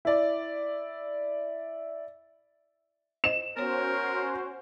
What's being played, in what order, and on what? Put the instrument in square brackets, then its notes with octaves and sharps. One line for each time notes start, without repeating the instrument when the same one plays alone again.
[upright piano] E4 D5
[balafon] C5 D#5 [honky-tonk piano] E7
[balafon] B3 C#5 [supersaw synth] C#4 F#4 C5 [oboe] A#4